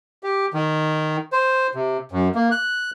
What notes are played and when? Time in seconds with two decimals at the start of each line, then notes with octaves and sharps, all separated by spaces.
0.23 G4
0.54 D#3
1.33 C5
1.75 C3
2.12 F#2
2.35 A#3
2.51 F#6